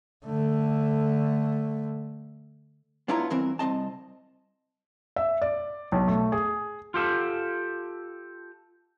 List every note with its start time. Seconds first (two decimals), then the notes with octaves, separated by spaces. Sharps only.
0.25 D3 A3
3.08 B3 D4 E4 F4 C#5 A#5
3.30 G2 E3 C4 A#4
3.59 C2 G#3 C4 D#5 A5
5.16 E5
5.42 D5
5.92 B1
6.08 A3
6.32 G#4
6.94 F4 G4 A4